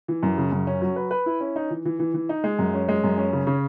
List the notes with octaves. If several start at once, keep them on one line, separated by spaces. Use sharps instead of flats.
E3
F#2
C#3
F#2
C#4
F#3
B4
B4
E4
C#4
D#4
E3
E3
E3
E3
D#4
G#3
F#2
C#4
G#3
F#2
C#4
C#3
C#3